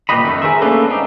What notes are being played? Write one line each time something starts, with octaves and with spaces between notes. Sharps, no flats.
A#2 G4 B4 D#5 B5
F#2 D#3 A3
G#4 A#4 C5 E5
A3 A#3 C#4 D4 A4 B4
C4 D4 D#4